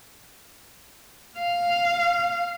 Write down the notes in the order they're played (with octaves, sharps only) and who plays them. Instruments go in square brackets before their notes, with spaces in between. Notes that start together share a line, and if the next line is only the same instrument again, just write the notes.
[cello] F5